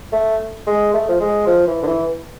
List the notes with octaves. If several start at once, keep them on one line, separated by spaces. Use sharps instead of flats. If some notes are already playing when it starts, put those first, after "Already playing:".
A3
G#3
A3
F3
G#3
F3
E3
D3
E3